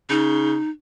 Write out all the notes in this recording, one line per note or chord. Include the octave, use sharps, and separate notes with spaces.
C#3 D#4